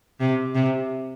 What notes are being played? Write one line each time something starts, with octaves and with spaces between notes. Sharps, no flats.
C3
C3